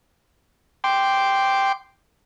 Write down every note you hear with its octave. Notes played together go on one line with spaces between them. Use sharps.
G5 C6 D6